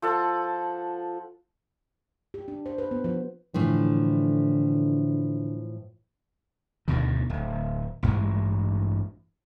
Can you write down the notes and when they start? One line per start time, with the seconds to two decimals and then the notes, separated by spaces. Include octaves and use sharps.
0.02 F3 A4 F#5
2.34 G4
2.48 D4
2.66 C5
2.78 B4
2.91 B3
3.04 F3
3.54 A2 D3 E3 F3
6.88 D2 G2 B2 D#3
7.30 D1
8.03 A1 G2 E3 G#3